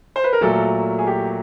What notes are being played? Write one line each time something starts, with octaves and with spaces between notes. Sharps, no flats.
C5
B4
A#4
A#2 F#3 A3 A4
G#4
G4